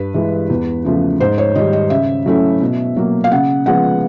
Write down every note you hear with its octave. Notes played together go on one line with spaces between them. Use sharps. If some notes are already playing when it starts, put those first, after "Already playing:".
Already playing: G2 B4
E3 G#3
E2
C#3 F3 A3
G#2 C5
C#5
D#3 G3 D#5
D#5
C#3 E5
F#3 A3 C#4 E4
B2
F#3 A#3
F5
C#3 F#5
F3 G#3 B3 F#5